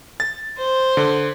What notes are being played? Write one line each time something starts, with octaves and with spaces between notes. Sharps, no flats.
A6
C5
D3